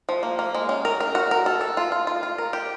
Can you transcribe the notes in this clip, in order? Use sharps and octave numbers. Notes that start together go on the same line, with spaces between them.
F3
A#3
A#3
G#3
C#4
A#4
A#4
F#4
A#4
A4
A4
F4
F4
F4
F4
A#4
G4